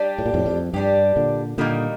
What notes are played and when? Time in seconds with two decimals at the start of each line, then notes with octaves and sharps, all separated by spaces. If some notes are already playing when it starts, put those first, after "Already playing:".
Already playing: G3 D4 G4
0.18 A2
0.26 A#2
0.34 F2 A2
0.46 F2
0.73 G2 G3 D4 G4
1.16 A#2 D3
1.58 A#2 D3 D#3 G3 A#3 D#4